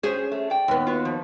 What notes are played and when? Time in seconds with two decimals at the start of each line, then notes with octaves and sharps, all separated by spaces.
0.03 C#4 G#4 C5 C#5
0.32 A3
0.50 D5 G5
0.68 D#2 B3
0.87 F4 F#4
1.05 F3